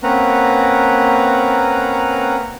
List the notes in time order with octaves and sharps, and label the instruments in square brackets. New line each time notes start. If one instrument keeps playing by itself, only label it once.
[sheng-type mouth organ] A#3 C4 C#4 B4 F#5 A#5